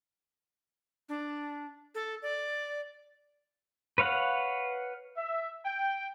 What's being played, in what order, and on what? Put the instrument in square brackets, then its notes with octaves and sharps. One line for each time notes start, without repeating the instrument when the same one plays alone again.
[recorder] D4
A4
D5
[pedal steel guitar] B4 C#5 F5 F#5
[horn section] E5
G5